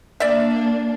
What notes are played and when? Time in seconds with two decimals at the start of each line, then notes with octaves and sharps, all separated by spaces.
0.20 A#3 D4 D5 E5